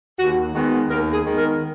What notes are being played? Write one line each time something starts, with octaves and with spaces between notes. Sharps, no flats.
D#2 F#4
D#3 G#3 B3 F#4
D#2 A#4
G#4
D#3 G#3 B3
A#4